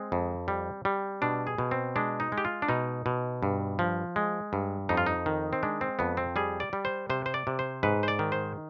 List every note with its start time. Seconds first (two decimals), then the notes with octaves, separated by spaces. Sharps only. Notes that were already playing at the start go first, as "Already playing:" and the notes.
Already playing: G#3 C4
0.12 F2
0.48 G3
0.85 G3
1.22 B2 D4
1.47 G#4
1.58 B2
1.71 C4
1.96 G#3 D4
2.20 D#4
2.32 G#3
2.38 G4
2.45 F4
2.62 D4
2.68 B2 D#4
3.06 B2
3.43 G2
3.79 F3
4.16 G#3
4.53 G2
4.89 F2 D#4
4.97 F4
5.07 D#4
5.26 D#3
5.53 C4
5.63 G#3 D4
5.81 C4
5.99 F2 B3
6.17 C4
6.36 G3 G#4
6.60 D5
6.73 G3
6.85 C5
7.10 C3 C5
7.26 C5
7.34 D5
7.47 C3
7.59 C5
7.83 G#2 B4
8.03 C5
8.08 D5
8.19 D#3
8.32 C5